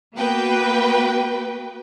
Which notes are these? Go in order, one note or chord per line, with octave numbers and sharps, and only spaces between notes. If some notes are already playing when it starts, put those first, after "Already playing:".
A#3 B3 F#4 B4 G5